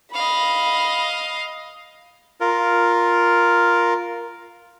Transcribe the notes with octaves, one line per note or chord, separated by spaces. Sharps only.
D#5 F5 B5
F4 A#4